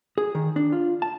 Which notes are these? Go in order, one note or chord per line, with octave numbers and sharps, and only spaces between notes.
G#4
D#3
D4
F4
A5